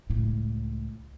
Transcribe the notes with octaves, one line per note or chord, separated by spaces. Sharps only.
C#2 A2